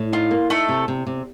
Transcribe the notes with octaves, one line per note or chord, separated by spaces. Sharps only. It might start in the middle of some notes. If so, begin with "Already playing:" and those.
Already playing: A2
D#4 F4
A#3
A3 D#4 A4
C3
C3
C3